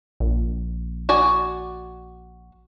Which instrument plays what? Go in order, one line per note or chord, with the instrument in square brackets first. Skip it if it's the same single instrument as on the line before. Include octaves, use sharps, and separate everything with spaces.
[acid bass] A#1
[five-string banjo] F#4 D5 G#5